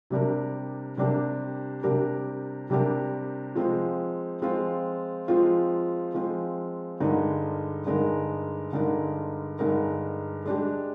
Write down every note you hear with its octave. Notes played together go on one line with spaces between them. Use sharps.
C3 G3 D4 G4 A#4
C3 G3 D4 G4 A#4
C3 G3 D4 G4 A#4
C3 G3 D4 G4 A#4
F3 G#3 C4 F4
F3 G#3 C4 F4
F3 G#3 C4 F4
F3 G#3 C4 F4
G2 D3 G#3 D#4 A#4
G2 D3 G#3 D#4 A#4
G2 D3 G#3 D#4 A#4
G2 D3 G#3 D#4 A#4
G#3 D4 G4